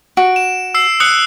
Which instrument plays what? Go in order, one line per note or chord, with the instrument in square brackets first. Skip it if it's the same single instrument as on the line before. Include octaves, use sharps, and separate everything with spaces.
[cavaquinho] F#4 [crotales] D7
[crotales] E7
E6 C7 E7
D#6 F#6 C#7